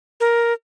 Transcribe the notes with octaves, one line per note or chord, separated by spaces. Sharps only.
A#4